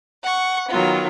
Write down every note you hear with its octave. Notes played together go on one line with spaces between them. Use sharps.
F#5 C#6
D#3 F#3 B3 F4